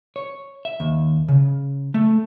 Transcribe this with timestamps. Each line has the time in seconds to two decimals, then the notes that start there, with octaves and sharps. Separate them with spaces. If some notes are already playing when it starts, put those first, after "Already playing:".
0.16 C#5
0.65 E5
0.80 D#2
1.28 C#3
1.94 A3